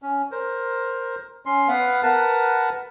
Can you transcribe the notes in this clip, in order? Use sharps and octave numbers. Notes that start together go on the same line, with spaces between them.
C#4
A#4 C5
C#4 C6
B3 B4 F5 F#5
A#4 B4 F#5 A5